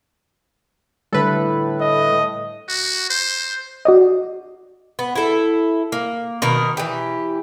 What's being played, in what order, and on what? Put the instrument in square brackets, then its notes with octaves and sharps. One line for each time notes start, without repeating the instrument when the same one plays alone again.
[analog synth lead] A2 [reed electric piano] D3 G3 [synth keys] A4 B4
[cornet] D#5
[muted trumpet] F#4
C5
[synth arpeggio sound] F#4 D5 D#5
[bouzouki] B3
E4 A4
A#3
B2 D#3 A#4
E3 G4